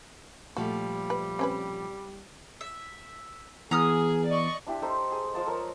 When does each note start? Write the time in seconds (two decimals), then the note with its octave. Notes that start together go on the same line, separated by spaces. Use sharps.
0.57 A#2 F3 G3 A3 F#4
1.10 B4
1.39 C4 C#4 B4
2.61 E5
3.71 E3 B3 G#4 A#5 D#6 F6
4.28 D5 D#5 C#6
4.67 D4 E4 G4
4.82 D#4 A4 C5
5.12 G#4
5.34 F3 A5 D#6
5.46 A4 A#4 C#5